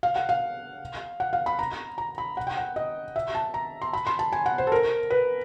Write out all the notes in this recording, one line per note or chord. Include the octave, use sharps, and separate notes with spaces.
F5
F#5
F5
F#5
F5
B5
A#5
A#5
B5
F#5
G5
F#5
D#5
E5
A5
A#5
C6
B5
C6
A5
G#5
F#5
C5
A4
A#4
B4